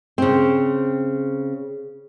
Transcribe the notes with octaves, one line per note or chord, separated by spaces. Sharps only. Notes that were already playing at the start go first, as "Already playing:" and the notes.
C#3 C4